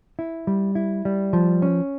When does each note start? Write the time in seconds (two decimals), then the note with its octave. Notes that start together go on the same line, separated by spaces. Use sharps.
0.19 E4
0.47 G3
0.75 E4
1.05 G3
1.33 F3
1.62 C#4